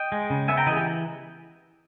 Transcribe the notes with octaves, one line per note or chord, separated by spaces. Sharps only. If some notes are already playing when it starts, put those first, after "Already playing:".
Already playing: D#5 G5
G#3
C#3
B3 E5 G#5
G5 A#5
E3 G#4 B4 D#5
G4